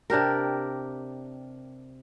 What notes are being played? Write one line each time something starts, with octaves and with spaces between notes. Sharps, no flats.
C3 D4 G4 A#4